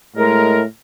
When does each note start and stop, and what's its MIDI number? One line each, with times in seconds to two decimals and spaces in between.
0.16 0.65 45
0.16 0.60 56
0.16 0.60 70